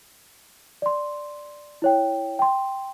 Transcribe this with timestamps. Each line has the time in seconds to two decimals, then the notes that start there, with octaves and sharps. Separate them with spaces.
0.82 D5 C6
1.82 E4 C#5 G5
2.39 G5 C6